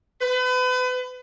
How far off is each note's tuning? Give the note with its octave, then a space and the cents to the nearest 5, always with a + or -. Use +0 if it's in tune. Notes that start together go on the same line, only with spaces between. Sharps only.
B4 +35